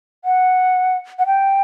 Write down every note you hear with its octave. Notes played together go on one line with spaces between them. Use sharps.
F#5
F#5
G5